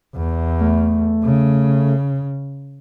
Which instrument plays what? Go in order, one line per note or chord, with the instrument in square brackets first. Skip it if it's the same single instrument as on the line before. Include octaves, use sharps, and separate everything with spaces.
[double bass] E2
[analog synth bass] A3
[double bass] C#3